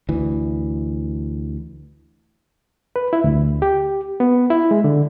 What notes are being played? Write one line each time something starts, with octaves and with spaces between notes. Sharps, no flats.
D2 E3
B4
E4
D2
G4
B3
E4
G#3
D3